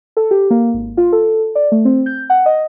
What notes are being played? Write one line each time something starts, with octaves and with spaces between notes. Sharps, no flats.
A4
G4
A#3
G#1
F4
A4
D5
A3
C4
G6
F#5
D#5